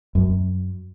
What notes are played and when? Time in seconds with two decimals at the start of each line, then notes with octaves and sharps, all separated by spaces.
0.15 F#2